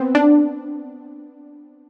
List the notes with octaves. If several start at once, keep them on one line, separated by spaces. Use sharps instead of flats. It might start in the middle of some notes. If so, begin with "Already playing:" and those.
Already playing: B3 C4
D4